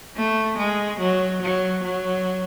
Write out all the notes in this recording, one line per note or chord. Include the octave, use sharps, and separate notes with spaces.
A3
G#3
F#3
F#3
F#3